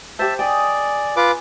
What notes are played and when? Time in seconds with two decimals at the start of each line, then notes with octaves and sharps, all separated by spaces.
0.19 G4 C5 E5 A5
0.39 G#4 D5 D#5 G5
1.17 F4 B4 D6